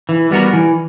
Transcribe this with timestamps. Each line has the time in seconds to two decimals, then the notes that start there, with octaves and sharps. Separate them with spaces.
0.09 E3
0.31 G3 B3 F#4 A#4
0.53 E3